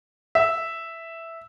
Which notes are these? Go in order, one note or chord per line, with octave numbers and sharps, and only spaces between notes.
E5